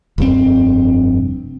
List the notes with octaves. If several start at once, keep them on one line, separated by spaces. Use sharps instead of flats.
F1 G2 B2 C4